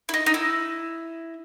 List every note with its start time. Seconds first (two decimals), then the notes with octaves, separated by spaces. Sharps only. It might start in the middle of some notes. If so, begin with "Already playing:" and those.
0.09 E4
0.14 D#4
0.26 D#4
0.34 E4